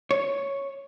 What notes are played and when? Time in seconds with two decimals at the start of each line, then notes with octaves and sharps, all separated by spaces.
0.11 C#5